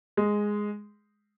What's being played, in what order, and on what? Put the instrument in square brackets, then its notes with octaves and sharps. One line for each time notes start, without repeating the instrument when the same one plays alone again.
[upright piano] G#3